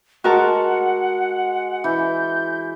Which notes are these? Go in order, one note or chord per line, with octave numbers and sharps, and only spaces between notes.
G#3 F#4 A#4 F#5 A5
E3 G6